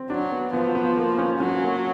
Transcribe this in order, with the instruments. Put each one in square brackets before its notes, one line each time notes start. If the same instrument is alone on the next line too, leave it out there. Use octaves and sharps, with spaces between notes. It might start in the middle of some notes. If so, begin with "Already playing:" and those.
Already playing: [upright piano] C4
[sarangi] F#3 [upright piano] D4
[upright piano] B3
[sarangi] F3 [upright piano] B3
[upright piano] B3
A#3
C#4
[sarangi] F#3 [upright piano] C#4
[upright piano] A#3